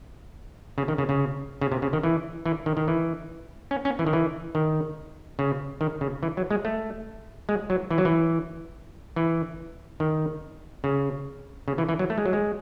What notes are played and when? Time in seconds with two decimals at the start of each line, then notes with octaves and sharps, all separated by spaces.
0.78 C#3
0.88 D#3
0.98 C#3
1.09 C#3
1.61 C#3
1.72 C3
1.82 C#3
1.93 D#3
2.03 E3
2.46 E3
2.66 D#3
2.77 D#3
2.88 E3
3.71 C#4
3.85 C#4
3.99 E3
4.07 D#3
4.13 E3
4.55 D#3
5.39 C#3
5.81 D#3
6.01 C#3
6.23 E3
6.37 F#3
6.51 G#3
6.65 A3
7.49 G#3
7.70 F#3
7.91 E3
7.98 F#3
8.05 E3
9.16 E3
10.00 D#3
10.84 C#3
11.68 C#3
11.78 E3
11.89 E3
11.99 F#3
12.10 A3
12.18 G#3
12.26 F#3
12.33 G#3